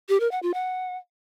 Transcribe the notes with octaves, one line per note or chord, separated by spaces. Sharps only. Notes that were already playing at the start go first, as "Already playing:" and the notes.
G4
A#4
F#5
F4
F#5